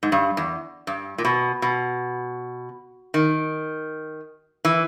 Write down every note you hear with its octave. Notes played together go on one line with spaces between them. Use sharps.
G#2
G2
E2
G2
A#2
B2
B2
D#3
E3